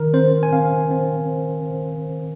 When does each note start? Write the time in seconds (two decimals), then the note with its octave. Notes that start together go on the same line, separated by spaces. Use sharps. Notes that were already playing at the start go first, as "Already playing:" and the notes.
Already playing: D#3 A#4
0.13 C4 C5
0.43 G#5
0.52 C4 F5
0.91 C4